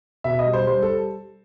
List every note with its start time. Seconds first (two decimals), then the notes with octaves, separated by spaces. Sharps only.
0.24 B2 E5
0.39 D#5
0.46 G3
0.53 C5
0.67 G3 C5
0.82 A4